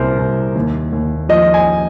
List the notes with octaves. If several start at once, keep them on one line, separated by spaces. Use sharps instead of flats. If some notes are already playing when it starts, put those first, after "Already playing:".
Already playing: C2 A#2 A#4 C5
C2
D#2
D#2
F3 D#5
G#5